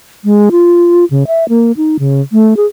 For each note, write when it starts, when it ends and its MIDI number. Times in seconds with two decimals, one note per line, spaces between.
0.25 0.49 56
0.51 1.05 65
1.11 1.24 49
1.27 1.48 76
1.49 1.72 58
1.77 1.97 63
1.99 2.21 49
2.32 2.56 57
2.57 2.66 68